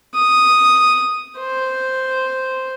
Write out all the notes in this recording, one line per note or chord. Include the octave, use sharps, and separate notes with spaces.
D#6
C5